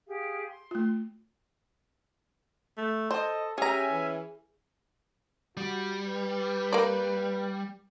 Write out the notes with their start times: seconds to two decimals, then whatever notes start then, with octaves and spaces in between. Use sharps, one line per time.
0.06 G4 G#4 F5
0.47 C6
0.71 A3 F4
2.78 A3
3.11 A4 C5 D#5
3.58 C#4 G4 G#4 E5 G#5 A#5
3.91 E3
5.57 G3 F#4
6.06 B4
6.73 A#3 D5